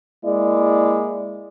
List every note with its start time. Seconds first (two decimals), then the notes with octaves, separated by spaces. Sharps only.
0.25 G#3 A#3 E4 D5